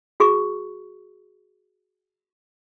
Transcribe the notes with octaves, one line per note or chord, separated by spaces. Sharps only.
F#4 G#4 C#6